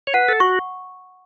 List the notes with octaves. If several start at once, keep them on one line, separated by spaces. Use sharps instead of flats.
C#5
B4 F#5
A4
F#4 C#6